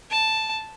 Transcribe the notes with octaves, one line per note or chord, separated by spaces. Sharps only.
A5